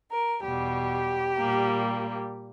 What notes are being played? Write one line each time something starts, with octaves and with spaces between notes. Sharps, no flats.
A#4
E2 B2 G3 G4
A#2 G3 A#3